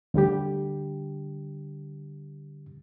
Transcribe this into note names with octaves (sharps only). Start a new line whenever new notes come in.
D2 D3 G3 G4